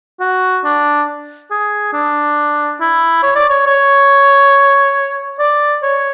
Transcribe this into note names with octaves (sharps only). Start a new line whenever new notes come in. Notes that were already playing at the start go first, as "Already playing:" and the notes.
F#4
D4
G#4
D4
E4
C#5
D5
C#5
C#5
D5
C#5